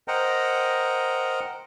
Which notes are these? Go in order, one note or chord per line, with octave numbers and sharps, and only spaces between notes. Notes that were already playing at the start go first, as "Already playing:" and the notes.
A#4 C5 D#5 F#5 G5 A#5